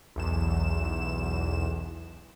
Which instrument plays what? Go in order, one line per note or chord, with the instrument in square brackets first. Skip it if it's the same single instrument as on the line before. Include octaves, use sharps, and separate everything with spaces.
[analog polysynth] B1 E2 E7